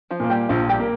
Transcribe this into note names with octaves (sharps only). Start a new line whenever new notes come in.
F3 F4
A#2 A#3
G3 G4
A#1 F3 F4
G3 G4
A#3